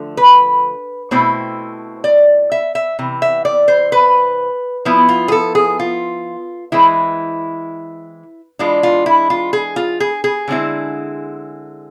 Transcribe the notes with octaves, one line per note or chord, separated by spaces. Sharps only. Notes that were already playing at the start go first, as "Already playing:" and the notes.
Already playing: D3 F3 A3
B4
B2 A3 C4 E4 C5
D5
E5
E5
C3 E3
E5
D5
C5
B4
F3 B3 E4
F4
G#4
A4
G#4
F4
E3 G#3 C4 E4
E3 G#3 D4 F4
F4
E4
F4
G#4
F4
G#4
G#4
D3 G#3 C4 E4